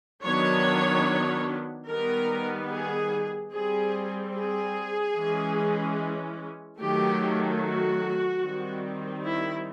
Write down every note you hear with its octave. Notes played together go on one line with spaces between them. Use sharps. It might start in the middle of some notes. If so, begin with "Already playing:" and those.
D#3 F#3 B3 D4 C#5
D#3 G3 B3 A#4
G#4
G3 C4 G#4
G#4
E3 G#3 C#4
D#3 F#3 A3 G4
F#4
D#3 G3 C4
E4